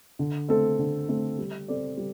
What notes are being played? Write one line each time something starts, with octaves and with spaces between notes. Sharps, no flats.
D3
A3 C4 A4
D3
A3 C4 A4
G3
C4 A4 D5
G3